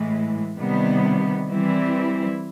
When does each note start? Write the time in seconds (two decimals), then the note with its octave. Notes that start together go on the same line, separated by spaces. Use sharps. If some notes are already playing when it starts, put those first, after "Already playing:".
Already playing: A2 E3 G#3
0.57 C3 D#3 G3 B3
1.49 E3 G3 C4 E4